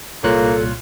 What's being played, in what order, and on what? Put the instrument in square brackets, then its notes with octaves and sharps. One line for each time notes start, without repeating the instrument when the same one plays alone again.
[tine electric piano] C2 A#2 F#6 [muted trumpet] A#3 [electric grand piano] F4 C#5 [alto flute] A4